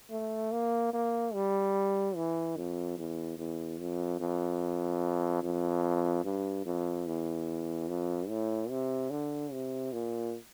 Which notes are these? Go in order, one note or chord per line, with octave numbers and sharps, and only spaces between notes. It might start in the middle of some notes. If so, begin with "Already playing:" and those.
A3
A#3
A#3
G3
E3
F2
E2
E2
F2
F2
F2
G2
F2
E2
F2
A2
C3
D3
C3
A#2